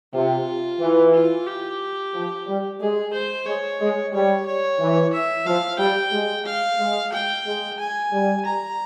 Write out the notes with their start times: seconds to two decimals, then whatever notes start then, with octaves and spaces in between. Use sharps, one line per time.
0.13 C3 F4
0.80 E3
1.14 F4
1.47 G4
2.14 F3
2.47 G3
2.80 G#3 G#4
3.13 C5
3.46 G#3 C#5
3.80 G#3
4.13 G3 C#5
4.46 C#5
4.80 E3
5.13 E5
5.46 F3 F5
5.79 G3 G5
6.12 G#3
6.46 F5
6.79 G#3
7.13 G5
7.46 G#3
7.79 G#5
8.12 G3
8.46 A#5